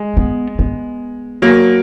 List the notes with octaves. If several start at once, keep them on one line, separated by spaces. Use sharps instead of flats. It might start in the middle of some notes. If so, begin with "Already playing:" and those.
Already playing: G#3
B3
B3
F#3 A#3